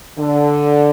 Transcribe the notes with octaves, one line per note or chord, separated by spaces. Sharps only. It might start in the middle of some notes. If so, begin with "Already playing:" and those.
D3